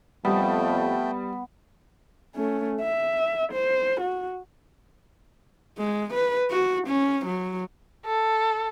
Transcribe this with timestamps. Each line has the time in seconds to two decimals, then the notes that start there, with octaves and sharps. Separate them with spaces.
0.25 F2 G3 A3 B3 G5
2.36 A3 C#4
2.81 E5
3.52 C5
4.00 F#4
5.78 G#3
6.14 B4
6.51 F#4
6.88 C#4
7.26 F#3
8.06 A4